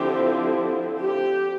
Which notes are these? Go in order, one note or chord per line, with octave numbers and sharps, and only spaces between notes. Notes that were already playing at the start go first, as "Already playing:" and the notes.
Already playing: D3 F3 C4 E4 G4
G4